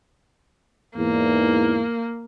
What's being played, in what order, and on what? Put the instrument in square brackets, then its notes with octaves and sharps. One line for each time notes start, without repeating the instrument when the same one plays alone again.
[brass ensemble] E2 G#2 [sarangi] A#3